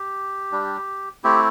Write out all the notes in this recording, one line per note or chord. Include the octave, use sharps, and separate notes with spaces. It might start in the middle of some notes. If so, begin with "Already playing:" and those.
Already playing: G4
G3 D4
A3 C4 E4 G4